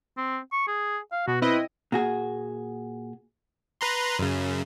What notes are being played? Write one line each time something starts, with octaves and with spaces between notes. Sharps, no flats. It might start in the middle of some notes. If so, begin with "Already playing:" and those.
C4
C#6
G#4
F5
B2 F#4
C4 E4 B4 D#5
A#2 F#4 G#4
B4 A#5 C6
F#2 C#3